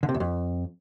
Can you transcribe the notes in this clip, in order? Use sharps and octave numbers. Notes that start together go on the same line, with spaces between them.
D3
C3
E2
F2